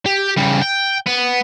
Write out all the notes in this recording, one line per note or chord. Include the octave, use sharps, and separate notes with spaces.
G4
C#3 G3
G5
B3